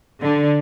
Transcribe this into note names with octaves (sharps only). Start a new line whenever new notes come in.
D3